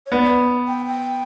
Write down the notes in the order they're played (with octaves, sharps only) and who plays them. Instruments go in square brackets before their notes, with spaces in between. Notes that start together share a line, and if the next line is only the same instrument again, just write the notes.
[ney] C#5
[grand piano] B3 [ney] D5
[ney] G5
G5